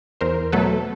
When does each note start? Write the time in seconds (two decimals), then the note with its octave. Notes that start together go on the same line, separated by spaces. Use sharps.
0.21 E2 A#4 C5
0.52 B2 F#3 A3 A4 B4